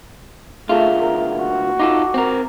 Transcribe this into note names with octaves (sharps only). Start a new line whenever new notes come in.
D2 A#2 A3 F4 G#4 E5 F5
A#4
F#4
D#4 F4 A4 D6
C4 A#4